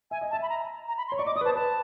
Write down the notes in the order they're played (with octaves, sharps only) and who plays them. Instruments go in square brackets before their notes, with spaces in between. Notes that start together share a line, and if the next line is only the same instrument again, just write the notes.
[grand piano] E5 [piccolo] G#5
[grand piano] D#5
[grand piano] E5 [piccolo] A5
[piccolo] B5
A#5
A#5
B5
C6
[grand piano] C#5
[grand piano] D5 [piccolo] C#6
[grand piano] D#5 [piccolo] D6
[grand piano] D5 [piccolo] D#6
[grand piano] B4
[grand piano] C5 [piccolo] A5
[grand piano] B4 [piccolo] A5